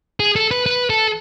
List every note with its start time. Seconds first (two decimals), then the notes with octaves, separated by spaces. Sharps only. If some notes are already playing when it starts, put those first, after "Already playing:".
0.20 G#4
0.36 A4
0.51 B4
0.66 B4
0.90 A4